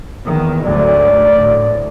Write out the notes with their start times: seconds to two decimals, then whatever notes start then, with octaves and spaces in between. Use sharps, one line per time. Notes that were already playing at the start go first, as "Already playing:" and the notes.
0.25 E2 D#3
0.64 G#1 D2 F#3 D5
1.33 D2 A2